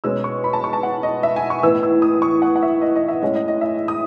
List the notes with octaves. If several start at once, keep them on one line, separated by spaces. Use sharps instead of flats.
B2 G#3 C#4 E6
C#6
B5
A5
C#6
A5
F#5
D#5
E5
G#5
C#6
A2 E3 B3 E6
E6
D#6
C#6
F#5
F#5
E5
D#5
D#5
E5
A2 G#3 C#4 D#5
D#5
D#5
E5
D#6